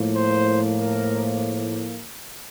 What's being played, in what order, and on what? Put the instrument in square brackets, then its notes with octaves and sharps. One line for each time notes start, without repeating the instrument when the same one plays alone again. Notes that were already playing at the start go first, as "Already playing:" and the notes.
Already playing: [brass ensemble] A2 F3 A#3
C5
A#4